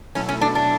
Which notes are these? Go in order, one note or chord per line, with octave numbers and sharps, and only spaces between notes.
B2 F#3 A3 C#4 E4 A4
C#4
D4
D4